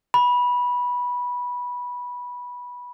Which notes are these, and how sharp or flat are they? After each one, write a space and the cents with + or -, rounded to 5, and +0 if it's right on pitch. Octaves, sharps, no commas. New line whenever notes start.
B5 -15